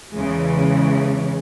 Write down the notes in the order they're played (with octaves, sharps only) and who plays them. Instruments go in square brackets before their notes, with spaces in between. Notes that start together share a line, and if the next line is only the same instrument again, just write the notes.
[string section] E2 C#3 E3 G#3